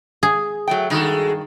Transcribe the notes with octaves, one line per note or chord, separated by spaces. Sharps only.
G#4
F#3 A3 G5
G2 D#3 G#3 F#4 A4